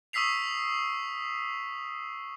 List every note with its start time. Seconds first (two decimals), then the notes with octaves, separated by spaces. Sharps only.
0.13 C#6 D#6 E6 B6 C7 F7